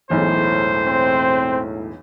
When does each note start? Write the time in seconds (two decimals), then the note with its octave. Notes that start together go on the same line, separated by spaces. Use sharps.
0.10 E1 B1 E2 A2 C5
0.87 C4